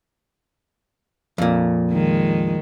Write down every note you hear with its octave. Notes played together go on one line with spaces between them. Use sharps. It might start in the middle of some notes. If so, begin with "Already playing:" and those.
F2 A#2
D#3 G#3